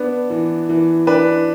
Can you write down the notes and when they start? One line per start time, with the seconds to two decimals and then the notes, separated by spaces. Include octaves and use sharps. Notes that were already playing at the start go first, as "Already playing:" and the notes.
Already playing: B3 D4
0.30 E3
0.69 E3
1.07 D4 B4